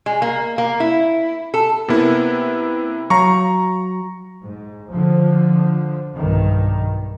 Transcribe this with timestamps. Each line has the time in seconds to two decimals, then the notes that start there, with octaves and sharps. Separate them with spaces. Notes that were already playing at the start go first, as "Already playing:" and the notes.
0.06 G#3
0.22 A#3
0.58 A#3
0.80 E4
1.54 A4
1.88 C3 A#3 B3 E4
3.10 F#3 F5 A#5 C#6
4.41 G#2
4.89 D3 F3
6.14 B1 G2 D#3